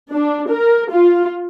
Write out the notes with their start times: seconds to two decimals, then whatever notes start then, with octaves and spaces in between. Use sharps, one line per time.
0.12 D4
0.50 A#4
0.91 F4